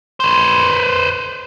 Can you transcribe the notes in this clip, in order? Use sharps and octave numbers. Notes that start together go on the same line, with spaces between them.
B4 C5